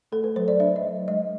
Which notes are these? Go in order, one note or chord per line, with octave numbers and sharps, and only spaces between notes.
A3 A4
B4
F#3 C5
D5
D4 E5
D#5
F#3
G#3 D#5